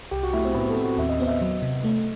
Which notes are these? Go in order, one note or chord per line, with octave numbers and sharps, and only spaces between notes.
C2 G4
F#4
A3 E4
C4
A2 B3
A3
C4
F#4
D#2 E5
D#5
B3 C5
E5
D#5
F#3
C3
A3